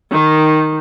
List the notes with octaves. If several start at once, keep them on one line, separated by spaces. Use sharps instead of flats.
D#3